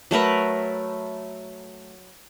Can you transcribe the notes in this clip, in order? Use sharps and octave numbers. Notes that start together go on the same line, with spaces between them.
F#3 A3 A#4 B4